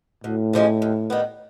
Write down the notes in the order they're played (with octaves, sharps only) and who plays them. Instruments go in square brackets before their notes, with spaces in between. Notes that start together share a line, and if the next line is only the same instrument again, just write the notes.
[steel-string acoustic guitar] D2 [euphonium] A2
[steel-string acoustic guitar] C3 F3 G#3 C#4
D#2
D#3 G3 B3